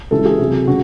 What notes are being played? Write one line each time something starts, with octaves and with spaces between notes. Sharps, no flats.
C#3 E3 G#3 A4
G#4
C3 F#3
C#3 F#4